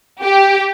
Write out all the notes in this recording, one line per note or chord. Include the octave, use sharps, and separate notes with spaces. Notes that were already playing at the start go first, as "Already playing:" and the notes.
G4